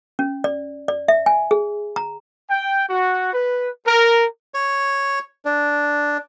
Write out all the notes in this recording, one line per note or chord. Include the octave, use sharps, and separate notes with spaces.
C#4
D5
D5
E5
G#5
G#4
A#5
G5
F#4
B4
A#4
C#5
D4